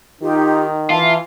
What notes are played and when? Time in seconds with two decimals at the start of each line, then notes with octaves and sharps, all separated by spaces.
0.22 D#3 D#4 F4 G4
0.90 E3 F4 E5 A5 A#5